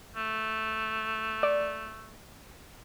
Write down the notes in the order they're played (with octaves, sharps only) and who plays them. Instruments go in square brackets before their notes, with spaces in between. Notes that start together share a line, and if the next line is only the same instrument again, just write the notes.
[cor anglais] A3
[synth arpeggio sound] D5